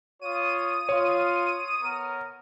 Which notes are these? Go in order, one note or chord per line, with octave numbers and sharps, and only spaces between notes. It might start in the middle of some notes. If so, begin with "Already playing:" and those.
F4 C#5 D#6 D#7
F4 C#5
B3 A#4